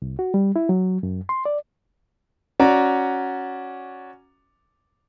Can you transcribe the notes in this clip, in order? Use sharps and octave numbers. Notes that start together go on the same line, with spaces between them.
C2
F#4
G3
E4
F#3
F#2
C6
D5
C#4 F#4 D5 A#5